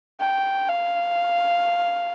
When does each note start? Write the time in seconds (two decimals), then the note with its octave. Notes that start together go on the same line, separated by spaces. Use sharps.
0.21 G5
0.69 F5